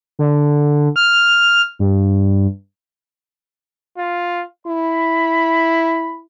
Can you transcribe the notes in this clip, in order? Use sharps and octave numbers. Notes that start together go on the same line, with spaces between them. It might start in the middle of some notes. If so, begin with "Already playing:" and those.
D3
F6
G2
F4
E4 B5